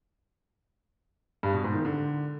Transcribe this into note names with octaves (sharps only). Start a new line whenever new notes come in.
G2
B2
G#2
D#3
D3